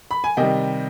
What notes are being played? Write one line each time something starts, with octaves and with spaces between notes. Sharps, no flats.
B5
G#5
C3 D#3 G3 D#5 G5